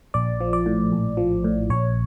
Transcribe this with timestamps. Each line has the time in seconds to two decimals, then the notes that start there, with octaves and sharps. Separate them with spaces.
0.14 A#1 D5
0.41 F3
0.53 D5
0.66 A2
0.92 A#1
1.17 F3
1.44 A2
1.70 A#1 C#5